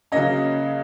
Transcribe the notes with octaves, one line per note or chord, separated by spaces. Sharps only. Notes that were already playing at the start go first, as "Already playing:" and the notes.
C#3 F#3 A#3 C#4 D#5